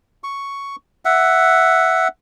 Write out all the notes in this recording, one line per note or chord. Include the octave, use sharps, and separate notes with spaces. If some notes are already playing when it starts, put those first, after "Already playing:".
C#6
E5 F#5